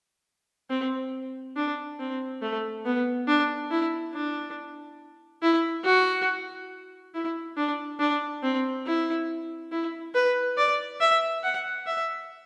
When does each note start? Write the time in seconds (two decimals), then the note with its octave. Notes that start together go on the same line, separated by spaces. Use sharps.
0.70 C4
1.56 D4
2.00 C4
2.42 A3
2.86 B3
3.28 D4
3.71 E4
4.14 D4
5.42 E4
5.85 F#4
7.14 E4
7.57 D4
7.99 D4
8.43 C4
8.86 E4
9.72 E4
10.14 B4
10.57 D5
11.01 E5
11.43 F#5
11.87 E5